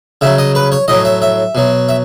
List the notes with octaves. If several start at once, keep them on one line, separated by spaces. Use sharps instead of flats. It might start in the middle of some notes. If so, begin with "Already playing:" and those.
C#3 F#3 E5
D#5
B4
C#5
A2 F#3 D#5
E5
E5
B2 F#3
E5